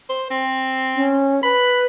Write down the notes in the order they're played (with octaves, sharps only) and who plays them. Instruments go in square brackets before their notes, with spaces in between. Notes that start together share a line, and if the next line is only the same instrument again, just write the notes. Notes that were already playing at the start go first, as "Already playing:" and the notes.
[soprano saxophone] C5
C4
[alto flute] C#4
[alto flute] B4 [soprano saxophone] B5